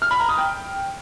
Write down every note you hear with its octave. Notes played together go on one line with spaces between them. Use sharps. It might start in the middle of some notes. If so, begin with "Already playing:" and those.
F6
B5
A#5
D#6
G5